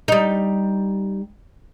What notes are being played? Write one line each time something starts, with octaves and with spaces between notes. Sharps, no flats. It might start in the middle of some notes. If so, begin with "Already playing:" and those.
G3 D#4